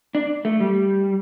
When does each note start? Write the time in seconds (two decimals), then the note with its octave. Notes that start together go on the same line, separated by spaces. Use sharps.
0.15 D4
0.45 A3
0.60 G3